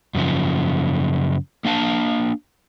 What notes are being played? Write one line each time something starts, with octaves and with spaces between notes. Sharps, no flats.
F#2 C#3 F3
A#3 D4 F5 A5